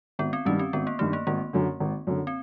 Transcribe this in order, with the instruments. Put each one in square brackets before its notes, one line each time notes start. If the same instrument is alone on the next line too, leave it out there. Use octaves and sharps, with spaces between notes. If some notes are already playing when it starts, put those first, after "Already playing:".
[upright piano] G#1 [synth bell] B3
[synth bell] C4
[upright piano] G2 D#3 G3 [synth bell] C#4
[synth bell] C4
[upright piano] G#1 [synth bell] B3
[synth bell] A#3
[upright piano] G2 D#3 G3 [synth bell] A3
[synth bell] A#3
[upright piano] G#1 [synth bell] A#3
[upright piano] F#2 D3
G#1
F#2 D3
[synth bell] C4